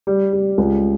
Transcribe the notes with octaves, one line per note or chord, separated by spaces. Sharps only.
G3
G3
C#2